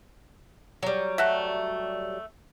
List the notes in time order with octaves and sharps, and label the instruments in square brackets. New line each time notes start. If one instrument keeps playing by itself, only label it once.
[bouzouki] F#3 G3
[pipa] A3 F#4 E5